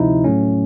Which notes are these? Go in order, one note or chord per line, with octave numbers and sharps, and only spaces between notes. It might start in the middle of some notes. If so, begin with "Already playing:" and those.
Already playing: D2 C3 F3 D#4 E4
A2 F#3 A3 C#4